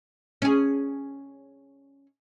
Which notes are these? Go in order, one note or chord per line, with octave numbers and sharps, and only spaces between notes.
C#4 G#4